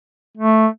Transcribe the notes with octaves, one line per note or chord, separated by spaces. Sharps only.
A3